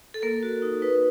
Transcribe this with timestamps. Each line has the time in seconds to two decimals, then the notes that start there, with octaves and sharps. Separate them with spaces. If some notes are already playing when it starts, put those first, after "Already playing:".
0.14 A4
0.22 A#3 A#4
0.43 F#4
0.62 D#4
0.82 D#4 B4